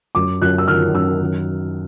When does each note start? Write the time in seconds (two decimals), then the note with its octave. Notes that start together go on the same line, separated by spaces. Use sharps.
0.15 F#2 D6
0.42 F#2 F#6
0.58 E6
0.68 D#3 F6
0.94 F#2 E6
1.21 D#3